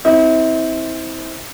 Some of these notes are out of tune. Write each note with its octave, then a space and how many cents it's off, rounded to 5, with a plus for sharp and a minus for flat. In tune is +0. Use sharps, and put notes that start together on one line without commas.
C4 +0 E4 -35